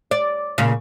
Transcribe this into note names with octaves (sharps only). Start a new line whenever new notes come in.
D5
A#2 C#3